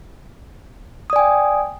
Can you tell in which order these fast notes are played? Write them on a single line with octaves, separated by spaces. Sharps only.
D#6 D5 G#5 G5